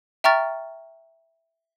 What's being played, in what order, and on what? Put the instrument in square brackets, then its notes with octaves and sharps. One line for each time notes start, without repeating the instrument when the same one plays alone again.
[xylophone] E5 G5 A#5 C#6 F6 A6